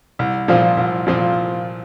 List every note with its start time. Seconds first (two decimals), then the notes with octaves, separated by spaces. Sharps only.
0.19 C2
0.48 A#2 F3 C4 F4
0.77 C2
1.07 A#2 F3 C4 F4